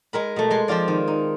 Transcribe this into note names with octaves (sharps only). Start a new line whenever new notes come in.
G#3 A#4 B5
B2 A3
G#3 C6
F3 C4 F4 D5
D#3
D#4